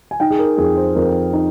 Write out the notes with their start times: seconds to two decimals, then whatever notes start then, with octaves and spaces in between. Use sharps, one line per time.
0.11 G#5
0.20 D#4 G5
0.30 G#4
0.39 A#4
0.57 F2 G#4
0.77 C5
0.95 F2 A#4
1.33 D#4